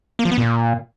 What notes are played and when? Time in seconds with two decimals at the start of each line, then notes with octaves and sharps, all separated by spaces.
0.19 A#3
0.25 F3
0.32 B3
0.38 A#2